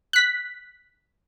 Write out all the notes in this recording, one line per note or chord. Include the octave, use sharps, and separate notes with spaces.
F#6 B6